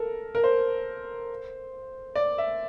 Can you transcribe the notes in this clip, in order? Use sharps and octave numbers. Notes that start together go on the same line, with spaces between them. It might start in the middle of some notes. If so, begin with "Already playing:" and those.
Already playing: A4 A#4
A#4
C5
D5
E5